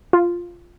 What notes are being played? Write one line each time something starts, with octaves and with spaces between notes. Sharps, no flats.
F4